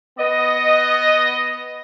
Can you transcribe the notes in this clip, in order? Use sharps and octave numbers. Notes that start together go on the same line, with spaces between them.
B3 D#5